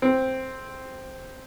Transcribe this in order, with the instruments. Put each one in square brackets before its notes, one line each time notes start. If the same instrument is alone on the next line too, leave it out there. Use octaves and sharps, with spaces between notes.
[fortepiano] C4